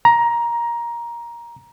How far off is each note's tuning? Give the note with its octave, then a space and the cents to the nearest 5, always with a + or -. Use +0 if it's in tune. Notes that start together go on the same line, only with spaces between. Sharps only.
A#5 +15